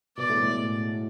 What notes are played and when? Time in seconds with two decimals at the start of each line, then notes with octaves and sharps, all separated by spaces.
0.17 B2 B3 D5
0.29 A2 A3
0.42 A2 A3
0.55 G#3